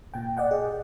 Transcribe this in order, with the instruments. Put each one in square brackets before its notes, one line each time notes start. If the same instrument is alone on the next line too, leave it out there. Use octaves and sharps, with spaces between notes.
[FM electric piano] A#2 G5
D5 D#5 F#5 G5
G#4